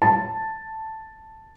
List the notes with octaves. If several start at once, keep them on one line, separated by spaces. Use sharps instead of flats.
A5